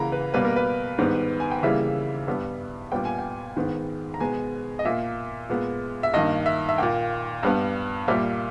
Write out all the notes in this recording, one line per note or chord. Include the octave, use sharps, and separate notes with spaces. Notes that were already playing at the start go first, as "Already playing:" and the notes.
Already playing: C#3 E3 A#3 A#5 B5
B4
B2 G3 A#3 B4
A#4
B4
G#2 D#3 G3 B3
G#5
G5
C#3 E3 G3 A#3 E5
G2 G3 B3
A#2 G3 B3 G5
G#5
G5
G#2 D#3 G#3 B3
A#5
B2 G#3 B3 G#5
D#5
A#2 A#3 E5
A#2 G#3 B3
E5
G2 D#3 A#3 D#5
E5
E5
A#2 A#3 G5
G2 G3 B3
A#2 G3 A#3 E5